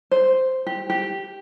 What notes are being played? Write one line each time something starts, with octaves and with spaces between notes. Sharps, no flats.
C5
G4
G4